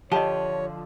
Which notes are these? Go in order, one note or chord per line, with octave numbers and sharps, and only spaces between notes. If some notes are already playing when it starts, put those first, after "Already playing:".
D3 F3 G4 C#5 D#5 A5